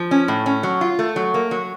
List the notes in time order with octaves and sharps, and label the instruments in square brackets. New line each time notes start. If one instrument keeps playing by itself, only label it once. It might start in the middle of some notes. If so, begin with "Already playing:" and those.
Already playing: [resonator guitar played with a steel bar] F3
C#4
A2
C#4
F#3
F4
A3
F#3
A#3
F#3